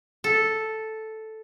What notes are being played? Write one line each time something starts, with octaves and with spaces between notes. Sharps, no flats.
A4